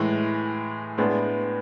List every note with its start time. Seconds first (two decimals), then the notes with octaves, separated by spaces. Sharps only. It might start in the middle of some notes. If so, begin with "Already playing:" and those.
Already playing: A2 E3 G#3
0.98 A2 G#3 B3 D4